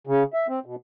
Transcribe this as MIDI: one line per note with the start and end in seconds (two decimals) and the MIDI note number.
0.07 0.23 49
0.34 0.47 76
0.48 0.59 60
0.66 0.75 47